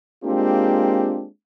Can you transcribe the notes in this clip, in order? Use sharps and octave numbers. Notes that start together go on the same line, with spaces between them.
G#3 A#3 C4 D4 F4 G4